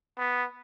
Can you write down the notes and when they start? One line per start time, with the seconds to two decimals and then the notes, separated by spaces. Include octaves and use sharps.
0.18 B3